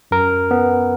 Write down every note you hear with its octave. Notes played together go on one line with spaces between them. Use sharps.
F#2 A#4
B3